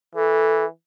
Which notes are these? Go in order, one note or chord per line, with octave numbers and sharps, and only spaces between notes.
E3 A4